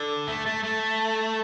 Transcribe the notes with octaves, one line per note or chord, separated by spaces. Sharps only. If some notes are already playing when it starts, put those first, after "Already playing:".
Already playing: D3
A3
A3
A3